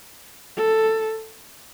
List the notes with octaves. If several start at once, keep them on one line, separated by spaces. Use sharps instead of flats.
A4